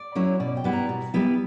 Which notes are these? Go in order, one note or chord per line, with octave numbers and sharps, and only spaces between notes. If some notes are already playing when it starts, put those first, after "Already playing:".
Already playing: D5
F#3 C#4 E4
B2 D5
G5
G3 B3 E4
A#5
B2
G3 B3 E4